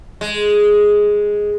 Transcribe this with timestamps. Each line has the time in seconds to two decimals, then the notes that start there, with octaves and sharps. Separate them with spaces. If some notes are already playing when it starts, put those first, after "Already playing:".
0.21 G#3